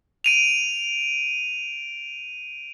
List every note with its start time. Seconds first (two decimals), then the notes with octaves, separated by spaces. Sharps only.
0.24 D7 D#7 F7